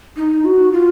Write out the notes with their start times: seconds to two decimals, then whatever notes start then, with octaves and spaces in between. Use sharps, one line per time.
0.17 D#4
0.45 F#4
0.72 F4